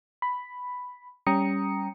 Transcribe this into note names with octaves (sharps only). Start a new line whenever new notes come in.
B5
G3 C#4 G5 A#5 D#6 C#7